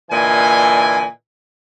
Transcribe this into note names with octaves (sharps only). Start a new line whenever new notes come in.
A#2 D3 E3 D#5 G#5